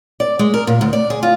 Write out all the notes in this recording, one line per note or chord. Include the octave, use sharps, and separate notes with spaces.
D5
G#3
A#4
A#2
D2
D5
G#4
F4